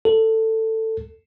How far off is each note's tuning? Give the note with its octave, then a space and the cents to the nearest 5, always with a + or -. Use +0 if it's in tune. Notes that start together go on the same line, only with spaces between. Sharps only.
A4 +15